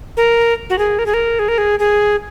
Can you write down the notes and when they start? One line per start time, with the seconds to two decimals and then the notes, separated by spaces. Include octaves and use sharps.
0.17 A#4
0.70 F#4
0.79 G#4
0.99 A#4
1.06 G#4
1.14 A#4
1.39 G#4
1.48 A#4
1.58 G#4
1.79 G#4